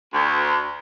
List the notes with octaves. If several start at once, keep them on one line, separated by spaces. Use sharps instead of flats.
D2